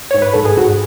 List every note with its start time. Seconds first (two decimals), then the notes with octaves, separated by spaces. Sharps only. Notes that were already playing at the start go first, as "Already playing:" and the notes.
0.11 G#2 C#5
0.22 B4
0.33 G#2 A4
0.45 G#4
0.57 G#2 F#4